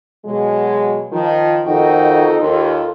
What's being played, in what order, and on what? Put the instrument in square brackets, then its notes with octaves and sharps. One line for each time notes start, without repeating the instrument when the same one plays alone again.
[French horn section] B2 F#3 G#3
D#3 F3
[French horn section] F2 D#4 [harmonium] D#3 F#4 G5
[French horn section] D#2 [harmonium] F4 A4